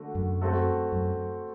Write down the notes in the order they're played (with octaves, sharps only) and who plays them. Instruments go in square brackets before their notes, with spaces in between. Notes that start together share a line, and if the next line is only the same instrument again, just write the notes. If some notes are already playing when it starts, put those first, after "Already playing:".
Already playing: [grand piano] D3 A3 D4 F#4
[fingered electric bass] F#2
[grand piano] A3 C4 F#4 A4
[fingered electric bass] F#2